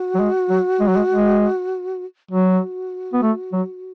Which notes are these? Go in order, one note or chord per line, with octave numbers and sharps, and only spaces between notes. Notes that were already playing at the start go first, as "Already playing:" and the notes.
Already playing: F#4
F#3
G#3
F#3
G#3
F#3
G#3
G#3
F#3 F#4
B3
A3
F#3